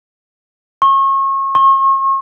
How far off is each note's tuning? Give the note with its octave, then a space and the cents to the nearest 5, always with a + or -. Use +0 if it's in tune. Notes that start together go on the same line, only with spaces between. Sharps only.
C#6 -35
C#6 -40